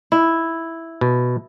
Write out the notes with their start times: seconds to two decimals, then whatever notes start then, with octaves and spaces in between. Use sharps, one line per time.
0.12 E4
1.01 B2